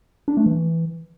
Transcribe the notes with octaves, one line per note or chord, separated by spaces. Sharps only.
D4
A3
E3